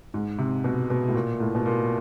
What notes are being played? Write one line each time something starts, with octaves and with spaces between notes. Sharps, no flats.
G#2
C3
B2
B2
A2
A#2
A2
B2
A#2